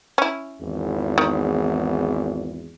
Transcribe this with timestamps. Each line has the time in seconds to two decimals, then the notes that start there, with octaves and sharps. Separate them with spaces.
0.18 C#4 E4
0.59 G#1 E2
1.18 D#3